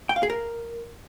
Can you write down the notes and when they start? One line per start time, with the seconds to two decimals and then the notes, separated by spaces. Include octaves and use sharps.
0.09 G5
0.16 F5
0.23 G#4
0.30 A#4